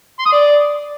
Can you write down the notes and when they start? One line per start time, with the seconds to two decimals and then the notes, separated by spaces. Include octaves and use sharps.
0.19 C6
0.26 D#6
0.32 D5